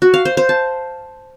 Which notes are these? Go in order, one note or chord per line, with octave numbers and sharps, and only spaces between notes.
F#4
F5
C5
C5
A5